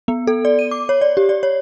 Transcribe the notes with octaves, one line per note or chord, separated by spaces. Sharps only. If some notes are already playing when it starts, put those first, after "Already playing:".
B3
A4
D5
D#7
D6
C#5
D5
G4
D5
C#5